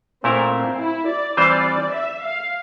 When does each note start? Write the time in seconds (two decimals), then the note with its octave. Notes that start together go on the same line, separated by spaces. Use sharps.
0.24 A#2 A3 C4 E4 A#4
0.53 C4
0.80 E4
1.08 D5
1.37 E3 G3 C4 F4 C5 D5
1.94 E5
2.23 F5